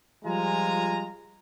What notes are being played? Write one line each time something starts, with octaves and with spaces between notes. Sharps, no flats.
F3 G3 G#3 F4 G#5 A#5